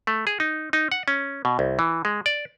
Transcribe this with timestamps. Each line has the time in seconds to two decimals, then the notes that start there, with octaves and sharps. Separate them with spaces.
0.07 A3
0.27 G#4
0.40 D#4
0.73 D#4
0.92 F#5
1.08 C#4
1.45 B2
1.59 C2
1.79 E3
2.05 G#3
2.26 D5